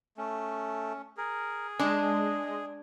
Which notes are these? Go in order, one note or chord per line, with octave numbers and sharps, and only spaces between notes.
A3 C#4
G#4 A#4
G#3 D4 D#5